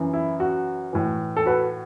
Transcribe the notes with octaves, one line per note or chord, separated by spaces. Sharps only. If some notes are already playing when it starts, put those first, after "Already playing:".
Already playing: F#2 E3
E4
F#4
A2 E3
A4
F#4 B4